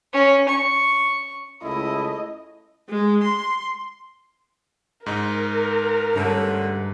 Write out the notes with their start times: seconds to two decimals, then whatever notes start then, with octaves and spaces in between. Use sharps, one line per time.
0.13 C#4
0.49 C#6
1.62 C#2 A3 E4 D#5
2.89 G#3
3.23 C6
5.06 G#2 D#4 A#4
6.16 G2 D3 A3 C#4